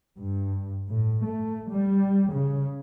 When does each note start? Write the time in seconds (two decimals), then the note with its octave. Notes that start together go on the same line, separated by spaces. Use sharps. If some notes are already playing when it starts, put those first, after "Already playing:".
0.17 G2
0.90 A2
1.25 A3
1.71 G3
2.32 C#3